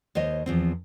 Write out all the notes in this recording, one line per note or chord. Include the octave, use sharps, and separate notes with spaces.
D#2 C5 C#5 D#5
E2 F3 C4